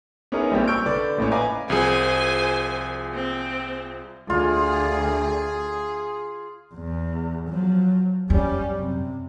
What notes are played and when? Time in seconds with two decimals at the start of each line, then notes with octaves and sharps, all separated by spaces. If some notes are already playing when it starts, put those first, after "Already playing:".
0.32 B3 C#4 D#4 E4 G#4 A#4
0.51 A#1 A#2 G3 C4 G4
0.68 C#6 E6 F6 G6 D7
0.86 D3 D4 B4 D5
1.18 A#1 A2 C#4
1.32 B4 D#5 F5 G#5 A#5 D6
1.70 C2 F3 G#4 C5 G#5
3.14 C4
4.30 D2 F4 G#4
6.74 E2
7.49 F3 F#3
8.30 F#2 G3 C#4
8.76 C3